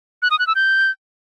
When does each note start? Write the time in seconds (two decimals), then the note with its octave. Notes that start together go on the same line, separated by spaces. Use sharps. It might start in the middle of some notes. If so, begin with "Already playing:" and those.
0.22 F#6
0.31 D#6
0.39 F#6
0.47 E6
0.55 G6